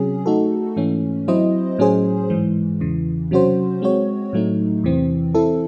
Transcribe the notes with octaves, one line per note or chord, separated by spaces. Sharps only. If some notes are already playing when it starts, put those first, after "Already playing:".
Already playing: C3 F#3 C#4 G#4
A3 D#4 F#4 A4
G#2 E3 A3 C#4
F#3 C4 E4 C5 D#5
A2 F#3 C#4 G#4 C5
G#2 E3 G#3
E2 C#3 E3
C3 F#3 C#4 F#4 C5
G#3 C4 F#4 C#5
A2 F#3 A3 D#4
E2 C3 E3 C4
E3 C4 E4 A4